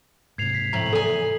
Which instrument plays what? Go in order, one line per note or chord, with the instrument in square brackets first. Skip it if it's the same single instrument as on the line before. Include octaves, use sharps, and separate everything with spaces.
[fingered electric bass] G#2 C3 [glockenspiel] G#6 C7 F7
[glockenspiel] B6
[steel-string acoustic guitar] F2 A2 [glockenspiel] A#5 F#7
[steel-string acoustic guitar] E2 G#5 [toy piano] A4